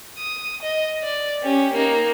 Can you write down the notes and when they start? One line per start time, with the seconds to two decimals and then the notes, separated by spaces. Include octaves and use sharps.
0.18 D#6
0.62 D#5
1.03 D5
1.42 C#4 G4
1.73 A#3 D#4